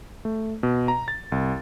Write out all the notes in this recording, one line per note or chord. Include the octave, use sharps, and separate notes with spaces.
A3
B2
A#5
A6
C2